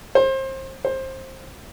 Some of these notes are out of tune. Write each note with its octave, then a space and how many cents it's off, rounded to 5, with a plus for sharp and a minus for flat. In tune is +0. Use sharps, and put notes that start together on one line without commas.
C5 +30
C5 +20